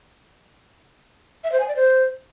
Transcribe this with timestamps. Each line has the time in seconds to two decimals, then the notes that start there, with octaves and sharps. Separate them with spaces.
1.44 E5
1.52 C5
1.60 G#5
1.68 D5
1.76 C5